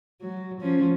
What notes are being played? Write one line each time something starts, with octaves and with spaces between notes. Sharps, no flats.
F#3
F3 C#4